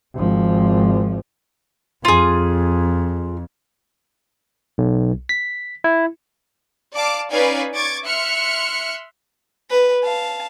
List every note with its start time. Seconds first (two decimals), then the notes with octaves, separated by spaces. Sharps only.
0.14 G#1 F3
2.05 F2 F4 G#4
4.78 B1
5.29 B6
5.84 E4
6.94 D5 F5 A5 D6
7.32 C#4 D#4 B4 D5 F5 G#5
7.75 C#6 D6 G#6 A6
8.06 E5 C6 F6 F#6 C#7
9.70 B4
10.04 F5 A5